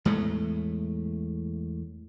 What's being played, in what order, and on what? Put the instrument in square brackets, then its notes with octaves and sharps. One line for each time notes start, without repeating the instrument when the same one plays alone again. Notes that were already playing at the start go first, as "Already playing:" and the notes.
[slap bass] E2 A2 G#3 A3